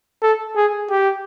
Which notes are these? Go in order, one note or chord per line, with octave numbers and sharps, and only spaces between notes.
A4
G#4
G4